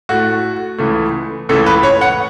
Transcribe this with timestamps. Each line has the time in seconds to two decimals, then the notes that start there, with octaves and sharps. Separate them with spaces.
0.09 A2 A3 F#4
0.78 C#2 C#3 E3 A3
1.49 C#2 C#3 E3 A3 A4
1.66 B4
1.83 C#5
2.01 F#5